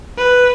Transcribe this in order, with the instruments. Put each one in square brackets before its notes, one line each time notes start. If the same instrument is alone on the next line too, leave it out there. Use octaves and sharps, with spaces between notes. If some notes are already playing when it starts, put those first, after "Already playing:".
[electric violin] B4